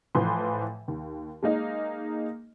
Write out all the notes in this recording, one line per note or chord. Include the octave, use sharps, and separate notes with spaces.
A2 E3 F3 B4 C6
D#2
G#3 A#3 D#4 D#5